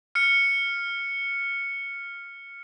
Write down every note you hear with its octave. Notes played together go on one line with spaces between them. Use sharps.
F6 C#7